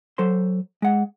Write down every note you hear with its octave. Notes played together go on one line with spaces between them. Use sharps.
F#3 A4 C5 C6
G#3 F#5